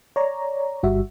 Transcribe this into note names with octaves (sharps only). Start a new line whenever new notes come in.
C#5 D5 A#5
G1 G3 F#4 E5